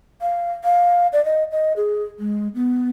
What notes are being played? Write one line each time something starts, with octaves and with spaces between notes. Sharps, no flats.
F5
F5
D5
D#5
D#5
G#4
G#3
B3